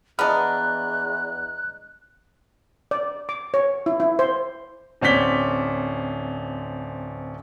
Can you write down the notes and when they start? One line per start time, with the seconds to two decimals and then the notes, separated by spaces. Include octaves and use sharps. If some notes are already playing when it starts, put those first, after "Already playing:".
0.19 E2 B3 D4 D#5 A#5 F6 F#6
2.91 D5
3.29 D6
3.54 C#5
3.86 E4
4.00 E4
4.19 C5
5.02 D1 C4 C#4 D5 B6 G7